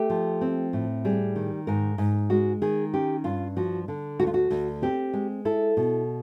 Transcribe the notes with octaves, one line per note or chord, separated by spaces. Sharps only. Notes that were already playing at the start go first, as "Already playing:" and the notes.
Already playing: A3 G4
F3
C4
A2
G3 G#4
D#3
G#2 A#4
G#2
G#3 F#4
D#3 G#4
C#4 G4
G2 F4
F3 F#4
D3
D2 F#4
F4
F#4
D2
C4 G4
G#3
E4 A4
B2